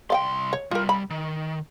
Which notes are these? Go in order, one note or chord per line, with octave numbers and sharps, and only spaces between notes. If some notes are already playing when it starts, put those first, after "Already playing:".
C2 D5 F5 G5 C6
C#5
C2 G3 F4 A#4
B5
D#3